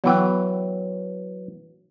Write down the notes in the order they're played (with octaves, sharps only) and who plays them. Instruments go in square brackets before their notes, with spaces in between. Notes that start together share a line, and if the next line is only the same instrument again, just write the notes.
[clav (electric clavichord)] E3 F#3 [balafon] B3 F#5 G5